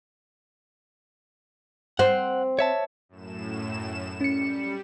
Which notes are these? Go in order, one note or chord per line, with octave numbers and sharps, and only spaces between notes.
C4 F#5
C#5 E5 A5
F#2 A2 E7
G3 C#4 C#7